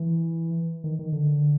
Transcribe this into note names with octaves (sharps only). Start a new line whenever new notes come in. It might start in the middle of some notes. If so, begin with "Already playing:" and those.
Already playing: E3
D#3
D#3
D3